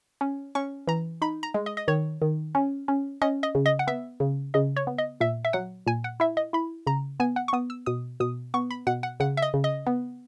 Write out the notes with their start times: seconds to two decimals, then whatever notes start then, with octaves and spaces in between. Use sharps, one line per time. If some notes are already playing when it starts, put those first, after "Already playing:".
0.21 C#4
0.55 C#4 C#6
0.87 E3 A#5
1.22 D#4 B5
1.43 A#5
1.54 G#3
1.66 D#5
1.77 D#5
1.88 D#3 C#5
2.22 D#3
2.55 C#4
2.88 C#4
3.22 C#4 D#5
3.43 D#5
3.55 C#3
3.66 D#5
3.79 F#5
3.87 B3 E5
4.20 C#3
4.54 C#3 D#5
4.76 C#5
4.87 B3
4.98 D#5
5.20 A#2 E5
5.45 E5
5.53 F#3 F#5
5.87 A#2 G#5
6.04 F#5
6.20 E4 E5
6.37 D#5
6.53 E4 B5
6.87 C#3 A#5
7.20 B3 G#5
7.36 F#5
7.48 C#6
7.53 B3 D#6
7.70 E6
7.86 B2 D#6
8.20 B2 D#6
8.54 B3 C#6
8.71 B5
8.87 B2 F#5
9.03 F#5
9.20 C#3 F#5
9.37 E5
9.42 D#5
9.54 C#3
9.64 D#5
9.87 B3